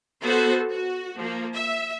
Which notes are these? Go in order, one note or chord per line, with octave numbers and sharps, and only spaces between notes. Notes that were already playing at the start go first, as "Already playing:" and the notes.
B3 F#4 A4 C5
F#4
F3 A#3
E5